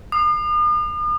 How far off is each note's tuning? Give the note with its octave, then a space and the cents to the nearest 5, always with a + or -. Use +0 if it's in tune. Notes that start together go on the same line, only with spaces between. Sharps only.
D#6 -45